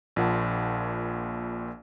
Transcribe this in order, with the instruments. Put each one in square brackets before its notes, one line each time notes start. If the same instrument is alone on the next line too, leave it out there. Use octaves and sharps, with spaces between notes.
[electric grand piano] A#1 A#2 F#5 A5